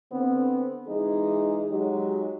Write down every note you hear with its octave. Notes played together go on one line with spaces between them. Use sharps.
D3 B3 C4
E3 G#3 D#4 G#4
F#3 G#3 D#4 G4